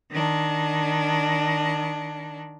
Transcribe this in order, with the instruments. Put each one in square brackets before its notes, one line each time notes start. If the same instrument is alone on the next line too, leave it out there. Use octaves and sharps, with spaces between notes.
[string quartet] D#3 D4